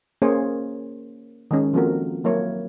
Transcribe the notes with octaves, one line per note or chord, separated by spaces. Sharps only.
A#3 C#4 G#4 C5 C#5
D#3 G#3 C#4
F3 A#3 C4 F#4 A4 A#4
F#3 A#3 E4 A#4 C#5